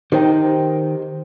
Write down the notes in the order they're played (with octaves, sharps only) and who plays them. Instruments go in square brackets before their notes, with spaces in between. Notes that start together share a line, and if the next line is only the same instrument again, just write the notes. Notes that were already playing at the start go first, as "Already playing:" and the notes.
[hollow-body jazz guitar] D#3 D#4 [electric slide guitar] G4 C5 G5